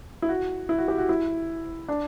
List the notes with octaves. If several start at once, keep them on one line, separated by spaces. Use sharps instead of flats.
E4
F#4
E4
F#4
G4
F#4
E4
D4